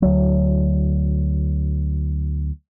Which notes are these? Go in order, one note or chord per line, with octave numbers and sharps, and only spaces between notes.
D2 F#3